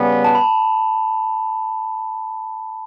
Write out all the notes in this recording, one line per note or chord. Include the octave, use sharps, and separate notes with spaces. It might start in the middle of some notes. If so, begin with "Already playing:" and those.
Already playing: C#3 G3 B3
A5
B5